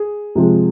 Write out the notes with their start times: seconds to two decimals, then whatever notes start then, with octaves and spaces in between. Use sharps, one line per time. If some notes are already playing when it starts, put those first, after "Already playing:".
Already playing: G#4
0.35 C3 F3 G#3